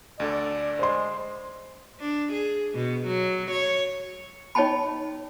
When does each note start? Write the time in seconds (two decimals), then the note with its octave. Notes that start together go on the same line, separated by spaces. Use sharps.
0.20 D2 D3 A4 D5
0.79 G#3 C5 C6
2.00 D4
2.33 G#4
2.75 B2
3.07 F#3
3.51 C#5
4.55 D#4 C#5 D#5 G5 A5 B5